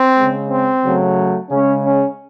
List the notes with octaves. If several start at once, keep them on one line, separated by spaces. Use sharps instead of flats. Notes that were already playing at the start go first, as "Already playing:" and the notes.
Already playing: C4
G#3
C#3
C4
C#3 F#3 A3
C#3 G#3 C#4
C#4